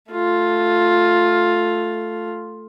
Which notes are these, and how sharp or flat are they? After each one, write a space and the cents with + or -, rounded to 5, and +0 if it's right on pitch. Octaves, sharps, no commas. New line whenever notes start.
A3 +0 F4 +5